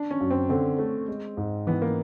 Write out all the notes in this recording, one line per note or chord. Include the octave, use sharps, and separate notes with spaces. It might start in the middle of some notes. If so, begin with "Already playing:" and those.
Already playing: D4
C#4
F#2
C4
D3 C4
A3
G#3
G#2
E3 B3
A#3